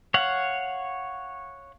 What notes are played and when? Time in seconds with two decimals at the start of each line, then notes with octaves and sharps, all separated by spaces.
0.14 C#5 F5 F#5